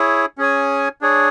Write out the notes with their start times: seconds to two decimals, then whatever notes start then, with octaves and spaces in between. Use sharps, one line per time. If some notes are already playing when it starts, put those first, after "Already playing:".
Already playing: E4 G#4 C#5
0.38 C#4 G#4 C#5 G#5
1.01 D4 G#4 C#5